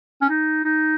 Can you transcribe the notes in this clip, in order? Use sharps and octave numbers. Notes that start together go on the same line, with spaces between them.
C#4
D#4
D#4